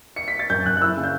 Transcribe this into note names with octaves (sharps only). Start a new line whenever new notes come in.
C#7
B6
A6
F#2 G6
F#2 F#6
F#6
E4 E6
C#3
G6